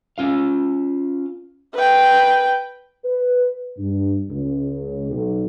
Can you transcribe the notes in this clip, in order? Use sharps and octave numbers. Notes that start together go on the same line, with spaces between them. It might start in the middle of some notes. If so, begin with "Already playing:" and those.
C#4 F4 F5
B4 G5
B4
G2
C#2
B1